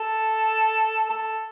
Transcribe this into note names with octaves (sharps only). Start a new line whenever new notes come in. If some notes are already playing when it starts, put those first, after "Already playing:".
Already playing: A4
A4